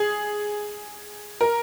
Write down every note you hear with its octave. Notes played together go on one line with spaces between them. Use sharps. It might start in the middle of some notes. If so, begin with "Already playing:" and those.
Already playing: G#4
A#4